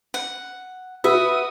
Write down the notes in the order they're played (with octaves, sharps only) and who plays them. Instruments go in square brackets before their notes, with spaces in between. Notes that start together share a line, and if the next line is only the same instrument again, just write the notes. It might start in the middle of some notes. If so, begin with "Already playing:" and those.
[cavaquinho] F#5
[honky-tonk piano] F#4 B4 [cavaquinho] E5 [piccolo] D#6